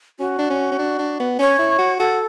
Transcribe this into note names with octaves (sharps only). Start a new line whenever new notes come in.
C#4 F#4
D4
C#4
C#4
D4
D4
B3
C#4 C#5
E4
F#4
F#4 A4